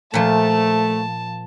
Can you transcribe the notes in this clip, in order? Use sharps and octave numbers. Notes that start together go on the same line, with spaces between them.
A#2 F3 A3 A5